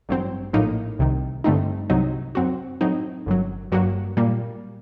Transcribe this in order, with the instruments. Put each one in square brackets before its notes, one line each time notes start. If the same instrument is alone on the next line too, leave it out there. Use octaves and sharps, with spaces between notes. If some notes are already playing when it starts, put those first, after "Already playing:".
[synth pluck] A1 G2 F#3 C4
A#1 A2 F#3 A#3 D#4
C2 C3 D#3
G2 D3 A3 C4 D#4
C2 C3 F#3 C4 D#4
F#2 F#3 C4 F#4
A2 F#3 C4 D#4
G1 F#2 F#3
G2 F#3 A#3 F#4
A#2 G3 A#3